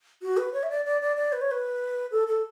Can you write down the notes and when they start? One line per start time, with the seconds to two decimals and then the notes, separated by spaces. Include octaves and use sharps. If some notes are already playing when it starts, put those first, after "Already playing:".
0.22 F#4
0.37 B4
0.53 C#5
0.63 E5
0.70 D5
0.85 D5
1.01 D5
1.16 D5
1.32 B4
1.41 C#5
1.51 B4
2.11 A4
2.27 A4